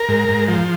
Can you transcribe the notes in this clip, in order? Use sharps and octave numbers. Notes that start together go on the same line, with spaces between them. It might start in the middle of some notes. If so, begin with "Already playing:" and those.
Already playing: A#4
G#2
G#2
F3